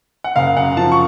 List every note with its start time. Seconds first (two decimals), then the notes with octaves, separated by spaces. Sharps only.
0.24 F#5
0.36 F#1 F5
0.56 F#2 F#5
0.77 F3 A5
0.92 C#6